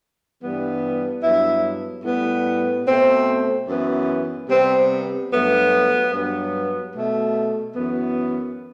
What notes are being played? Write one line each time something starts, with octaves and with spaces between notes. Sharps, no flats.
G2 E3 G3 B3
G2 F#3 B3 E4
A2 G3 B3
B2 A3 C4
F#2 E3 B3
C3 G3 B3 C4
G2 F#3 A3 B3
G2 F#3 B3
B2 A3
F#2 E3 B3